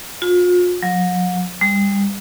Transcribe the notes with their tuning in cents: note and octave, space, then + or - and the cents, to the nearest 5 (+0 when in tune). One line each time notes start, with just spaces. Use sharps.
F4 +40
F#3 -40
G3 +30